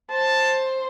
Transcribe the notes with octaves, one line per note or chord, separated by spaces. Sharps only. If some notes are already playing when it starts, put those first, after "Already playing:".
C5 A5